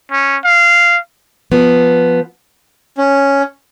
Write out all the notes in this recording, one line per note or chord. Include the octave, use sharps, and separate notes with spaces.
C#4
F5
F3 B3
C#4